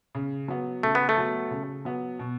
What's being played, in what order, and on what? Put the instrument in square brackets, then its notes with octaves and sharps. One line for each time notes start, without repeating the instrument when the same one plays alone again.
[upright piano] C#3
F#3 B3
[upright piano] C#3 [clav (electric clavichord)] A3
[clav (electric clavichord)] B3
A3
[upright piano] F#3 B3
C#3
F#3 B3
B2